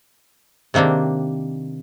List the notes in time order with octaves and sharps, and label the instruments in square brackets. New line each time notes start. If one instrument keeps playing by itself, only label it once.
[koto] C3 D#3 A#3 C4 D4